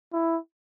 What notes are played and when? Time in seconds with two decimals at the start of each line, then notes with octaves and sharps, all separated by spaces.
0.13 E4